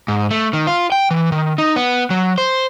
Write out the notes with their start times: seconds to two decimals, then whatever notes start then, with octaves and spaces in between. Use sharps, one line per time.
0.08 G#2
0.31 A3
0.53 D#3
0.67 F4
0.92 G5
1.11 E3
1.32 D#3
1.58 D#4
1.76 B3
2.10 F#3
2.38 C5